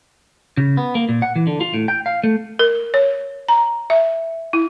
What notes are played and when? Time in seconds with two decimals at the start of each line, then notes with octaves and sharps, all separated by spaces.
0.57 C#3
0.77 B3
0.95 A#3
1.09 A#2
1.22 F#5
1.36 E3
1.47 D3
1.61 F4
1.74 A2
1.88 G5
2.06 F5
2.24 A3
2.59 A#4
2.94 C#5
3.49 A#5
3.90 E5
4.53 E4